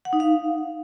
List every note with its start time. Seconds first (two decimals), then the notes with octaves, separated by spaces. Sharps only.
0.05 F#5
0.13 D#4
0.20 F5